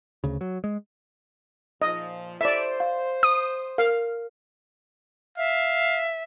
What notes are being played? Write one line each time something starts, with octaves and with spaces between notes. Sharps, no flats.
D2 C#3
F#3
G#3
A#2 F3 D#5
C5 D5 E5
F5
D#6
A#4 F5
E5 F5